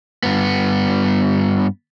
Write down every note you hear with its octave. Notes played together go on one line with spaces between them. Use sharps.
G2 B3